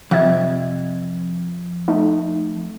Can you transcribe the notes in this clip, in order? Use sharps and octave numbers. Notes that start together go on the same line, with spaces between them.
F2 C3 E5 G#6
A3 D#4